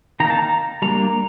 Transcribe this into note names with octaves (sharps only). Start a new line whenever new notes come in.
D#3 A#3 D#4 A#5
A5
A#5
G3 A#3 D4 A#5